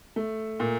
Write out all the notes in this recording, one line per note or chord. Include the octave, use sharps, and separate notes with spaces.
A3
A#2